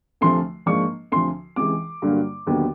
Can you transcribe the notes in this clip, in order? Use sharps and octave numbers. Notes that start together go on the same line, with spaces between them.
D2 C3 F3 A3 C6
G#2 F3 A#3 D4 C#6
D2 C3 F3 C6
C#2 C3 E3 G#3 D6
G2 D3 F#3 A#3
D#2 D3 F#3 B3